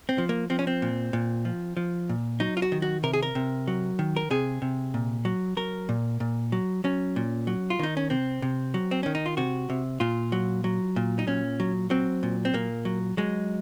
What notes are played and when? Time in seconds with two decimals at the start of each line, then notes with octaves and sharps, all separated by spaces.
0.09 C4
0.18 F3
0.29 A#3
0.50 F3 C4
0.59 C#4
0.67 C4
0.82 A#2
1.13 A#2
1.45 F3
1.77 F3
2.09 A#2
2.40 F#3 D#4
2.57 F4
2.62 F#4
2.72 D#3
2.82 F#4
3.03 C3 A#4
3.13 G#4
3.23 A#4
3.35 C3
3.68 F#3
3.99 D#3
4.17 A#4
4.31 C3 G#4
4.62 C3
4.94 A#2
5.25 F#3
5.57 F#3 A#4
5.89 A#2
6.20 A#2
6.52 F#3
6.84 F#3 C#4
7.16 A#2
7.47 F#3
7.70 F4
7.79 D#3 D#4
7.97 C#4
8.10 C3 C4
8.42 C3
8.74 F#3
8.91 C4
9.03 D#3 C#4
9.15 D#4
9.26 F4
9.37 C3 F#4
9.70 C3
10.00 A#2 F4
10.32 F#3
10.64 F#3
10.96 A#2
11.19 D#4
11.27 A#2 C#4
11.60 F#3
11.90 F#3 C4
12.23 A#2
12.45 C4
12.54 A#2 A#3
12.85 F#3
13.17 F#3 G#3